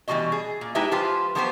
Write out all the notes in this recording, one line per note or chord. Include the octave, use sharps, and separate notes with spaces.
B2 E3 G3 G#3 F#4 D#5
G#4
A#2
G#3 D#4 E4 G4 B4 E5
F3 F4 G4 B4 C5
F3 F#3 B3 G4 B4 C5